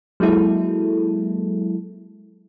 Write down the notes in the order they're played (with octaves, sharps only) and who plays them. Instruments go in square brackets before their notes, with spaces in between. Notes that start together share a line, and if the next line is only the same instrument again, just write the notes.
[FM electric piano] F#3 G#3 A#3 E4 A4